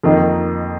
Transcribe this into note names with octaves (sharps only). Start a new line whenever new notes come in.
F2 D#3 A#3 D#4